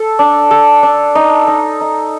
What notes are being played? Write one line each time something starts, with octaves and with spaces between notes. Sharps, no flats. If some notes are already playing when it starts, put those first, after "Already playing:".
Already playing: A4
D4
A4
D4
D#4
D#4
D#4